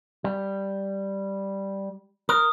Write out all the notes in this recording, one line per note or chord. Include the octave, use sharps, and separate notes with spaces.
G3
A#4 D#6